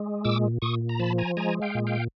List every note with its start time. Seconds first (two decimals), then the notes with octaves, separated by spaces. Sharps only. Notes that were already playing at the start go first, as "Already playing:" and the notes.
Already playing: G#3
0.25 A#2 D6 E6
0.62 A#2 C#6 D#6
0.89 A#5
0.99 F3 A5 B5
1.18 G#5 A#5
1.37 G#3 G#5 A#5
1.62 F5 G5
1.75 A#2
1.87 F5 G5